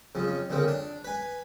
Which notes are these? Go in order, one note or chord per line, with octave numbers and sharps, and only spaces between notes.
F2 C#3
D2 A#2 C#3 C4
D4
B4 G#5